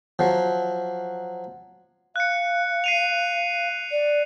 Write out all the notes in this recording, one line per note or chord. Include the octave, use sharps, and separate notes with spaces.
F3 F#3
F5 F#6 C#7
C7 D#7 F7
D5